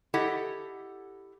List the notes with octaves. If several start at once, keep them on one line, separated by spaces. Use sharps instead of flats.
E4 G4 A4 D#5 F#5